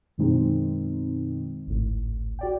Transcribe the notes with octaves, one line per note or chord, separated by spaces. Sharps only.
F#2 B2 D#3 G#3 C4 D#4
G#1 C#2 A2
F#4 D5 G5